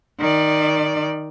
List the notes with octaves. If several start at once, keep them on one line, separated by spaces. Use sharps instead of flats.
D#3 D5